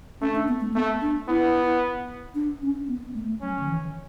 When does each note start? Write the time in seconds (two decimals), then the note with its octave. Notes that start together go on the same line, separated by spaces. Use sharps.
0.21 A3 C#4
0.35 D4
0.48 B3
0.61 A3
0.74 A3 B3
1.02 D4
1.28 B3 E4
2.35 D4
2.62 C#4
2.88 B3
3.15 A3
3.41 F#3 C#4
3.59 D3
3.68 E3